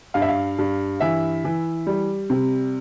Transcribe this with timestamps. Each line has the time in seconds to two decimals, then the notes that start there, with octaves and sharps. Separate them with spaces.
0.14 G2 F5
0.22 E5
0.28 F5
0.58 G2
1.00 E3 E5
1.45 E3
1.87 G3
2.30 C3